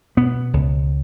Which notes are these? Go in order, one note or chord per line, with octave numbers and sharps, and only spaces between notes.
B2 B3
C#2